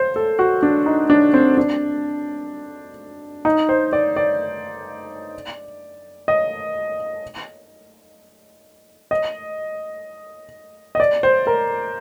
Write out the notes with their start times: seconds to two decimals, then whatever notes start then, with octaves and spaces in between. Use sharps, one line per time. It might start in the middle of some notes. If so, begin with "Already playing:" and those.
Already playing: C5
0.16 A4
0.39 F#4
0.63 D4
0.86 D#4
1.10 D4
1.34 C4
1.57 D4
3.45 D#4
3.69 C5
3.93 D5
4.16 D5
6.28 D#5
9.11 D#5
10.95 D#5
11.00 D5
11.23 C5
11.47 A#4